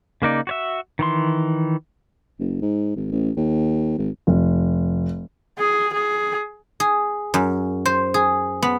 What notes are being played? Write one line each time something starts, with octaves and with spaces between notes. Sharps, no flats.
C#3 A#3 D#4 D5
F#4 C#5 E5
D#3 E3 C6
F#1
G#2
G#1
A1
D#2
G#1
F1
G#4
G#4
G#4
F#2
C5
G#4
B3